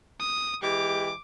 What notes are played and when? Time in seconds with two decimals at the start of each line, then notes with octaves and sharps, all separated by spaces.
0.20 D#6
0.63 E3 G#3 G4 D6